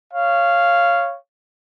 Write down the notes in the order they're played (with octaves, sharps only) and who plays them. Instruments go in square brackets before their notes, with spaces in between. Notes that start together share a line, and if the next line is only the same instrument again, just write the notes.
[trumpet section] C#5 F5